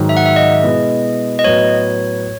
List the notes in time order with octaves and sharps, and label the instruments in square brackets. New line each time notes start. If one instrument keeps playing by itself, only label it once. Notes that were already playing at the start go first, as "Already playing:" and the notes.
Already playing: [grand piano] G#2 D#3 F#3
[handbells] E5
F#5
E5
D#5
[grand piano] B2 G#3 B3 E4
[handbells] D#5
[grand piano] A2 F#3 B3 [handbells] C#5